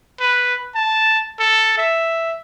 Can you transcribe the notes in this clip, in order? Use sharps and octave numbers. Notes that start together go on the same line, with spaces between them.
B4
A5
A4
E5